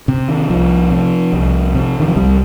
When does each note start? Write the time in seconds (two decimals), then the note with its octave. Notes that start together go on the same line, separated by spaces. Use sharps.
0.08 C3
0.28 D#3
0.50 C2 F3
0.91 C3
1.33 C2
1.74 C3
2.00 D#3
2.08 F3
2.16 C2 G3